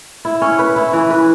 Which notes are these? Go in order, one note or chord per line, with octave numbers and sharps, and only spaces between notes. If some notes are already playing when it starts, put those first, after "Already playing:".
E4
C#4
B4
E4
E3
B4